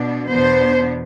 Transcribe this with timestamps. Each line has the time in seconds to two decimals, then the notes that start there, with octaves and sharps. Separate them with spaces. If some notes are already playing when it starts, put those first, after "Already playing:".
Already playing: B2 B3 D4
0.28 E2 B2 B3 D4 C5